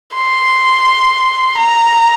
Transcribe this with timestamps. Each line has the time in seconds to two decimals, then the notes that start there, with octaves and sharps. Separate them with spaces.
0.15 C6
1.58 A#5